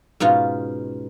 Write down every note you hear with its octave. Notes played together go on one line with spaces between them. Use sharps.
G#2 B2 C#4 F4